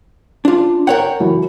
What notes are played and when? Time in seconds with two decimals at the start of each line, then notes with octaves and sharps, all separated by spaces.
0.45 D4 F4
0.87 A#4 C#5 F#5 G5
1.20 E3 F#3